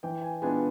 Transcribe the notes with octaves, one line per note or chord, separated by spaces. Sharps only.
E3 G5
G#5
G#3 B3 D4 F4 G#5